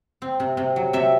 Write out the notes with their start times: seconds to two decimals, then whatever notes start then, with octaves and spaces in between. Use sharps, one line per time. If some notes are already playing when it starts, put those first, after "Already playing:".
0.22 C4
0.40 C3
0.57 C3
0.76 F#3
0.93 C3 E5